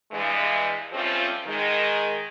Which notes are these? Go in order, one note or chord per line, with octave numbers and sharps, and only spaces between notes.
G2 E3 G#3
F3 G3 A3 C4 C#4 F4
D#3 G#3